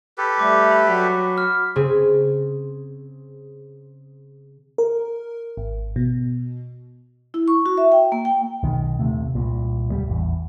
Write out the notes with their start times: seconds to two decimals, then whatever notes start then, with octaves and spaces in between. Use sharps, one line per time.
0.18 G4 A4 B4
0.39 G3 A3 D6
0.71 B5
0.87 F#3 F#4 B6
1.38 F6
1.76 C#3 C4 G#4
4.78 A#4
5.57 G#1
5.96 B2
7.34 E4
7.48 C#6
7.66 F#4
7.78 E5
7.92 G5
8.12 A#3
8.25 G5
8.63 B1 D#3
8.99 D#1 C3 A3
9.35 C2 A#2
9.92 D1 G3
10.08 A1 E2